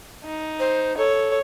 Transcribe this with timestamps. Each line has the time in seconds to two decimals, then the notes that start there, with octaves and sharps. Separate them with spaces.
0.25 D#4
0.60 C5
0.98 A4 C#5